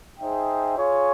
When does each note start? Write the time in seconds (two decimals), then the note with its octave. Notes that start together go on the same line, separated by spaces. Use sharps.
0.19 D#4 G#4 C5 E5 G5
0.77 F4 G#4 C#5